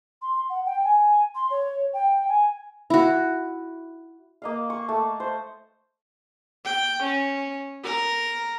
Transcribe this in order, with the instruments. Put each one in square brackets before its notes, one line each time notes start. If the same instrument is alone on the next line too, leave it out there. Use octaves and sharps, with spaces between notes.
[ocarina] C6
F#5
G5
G#5
C6
C#5
G5
G#5
[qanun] E4 F#4
[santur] A#3 D#5 F5
C#6
A3
C5
[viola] G5
C#4
A#4